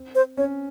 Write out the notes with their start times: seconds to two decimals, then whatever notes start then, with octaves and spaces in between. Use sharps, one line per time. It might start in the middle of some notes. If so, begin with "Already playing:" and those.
Already playing: C4
0.15 C5
0.37 C#4 C#5